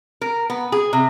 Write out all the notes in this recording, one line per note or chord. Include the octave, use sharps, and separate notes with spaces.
A#4
B3
G#4
C3